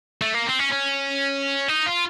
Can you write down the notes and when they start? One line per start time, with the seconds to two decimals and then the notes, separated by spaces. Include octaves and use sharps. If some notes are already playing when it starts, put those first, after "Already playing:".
0.22 A3
0.34 A#3
0.47 C4
0.59 C#4
0.72 C#4
1.69 D#4
1.86 F4